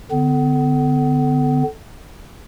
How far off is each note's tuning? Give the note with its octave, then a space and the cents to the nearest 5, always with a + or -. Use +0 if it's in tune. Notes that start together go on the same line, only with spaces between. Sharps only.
D3 +0 B3 +40